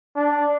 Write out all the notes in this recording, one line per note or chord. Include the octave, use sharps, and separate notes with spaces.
D4